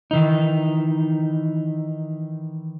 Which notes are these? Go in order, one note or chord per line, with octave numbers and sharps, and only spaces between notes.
D#3 E3 D#4